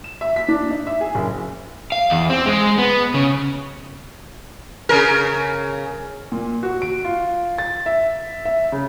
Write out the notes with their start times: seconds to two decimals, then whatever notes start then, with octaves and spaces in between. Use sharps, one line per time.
0.04 E7
0.21 E5
0.36 B6
0.48 D4
0.70 D#4
0.87 E5
1.01 G#4
1.15 F#1
1.92 F5
2.10 E2
2.30 C4
2.46 G#3
2.78 B3
3.14 C#3
4.89 C#3 A#4
6.32 A#2
6.63 F#4
6.82 D7
7.05 F4
7.58 A6
7.86 E5
8.45 E5
8.72 C#3